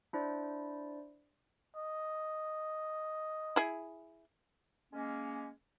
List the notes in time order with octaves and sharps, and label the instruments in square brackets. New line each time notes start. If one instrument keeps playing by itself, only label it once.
[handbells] D4 E4 C5 D5
[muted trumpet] D#5
[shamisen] E4 G#4
[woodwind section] G#3 A#3 C#4